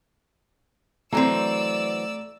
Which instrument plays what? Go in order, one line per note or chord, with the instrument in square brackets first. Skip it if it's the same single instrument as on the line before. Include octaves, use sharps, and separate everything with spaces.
[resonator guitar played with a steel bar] E3 F#3 C4 [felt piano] A3 A#5 [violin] D5 E6